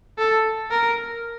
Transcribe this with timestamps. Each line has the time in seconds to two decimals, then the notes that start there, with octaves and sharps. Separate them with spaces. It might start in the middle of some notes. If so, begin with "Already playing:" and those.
0.18 A4
0.71 A#4